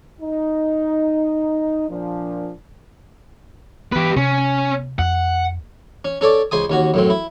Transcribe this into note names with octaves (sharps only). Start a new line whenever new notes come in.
D#4
A#2 F3 D4
E3 B3 G4 B4
C3 C#4
F2 F#5
C#4
C#4 A4 C#5 D5
C#2 C5 G#5 D#6
D#2 C#4 F#4
F#2 A2 C4
E4